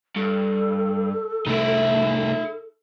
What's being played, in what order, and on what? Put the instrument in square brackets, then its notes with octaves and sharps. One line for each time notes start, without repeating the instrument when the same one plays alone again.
[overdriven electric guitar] G2 [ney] A4
[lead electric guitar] C2 A3 [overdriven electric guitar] D#4 E5